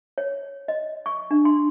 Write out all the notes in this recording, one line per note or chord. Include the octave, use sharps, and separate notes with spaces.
C#5
D#5
C#6
D4
C6